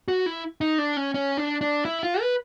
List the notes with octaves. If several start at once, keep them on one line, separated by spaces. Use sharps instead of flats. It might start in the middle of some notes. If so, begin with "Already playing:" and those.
F#4
E4
D#4
D4
C#4
C#4
D4
D4
E4
F4
B4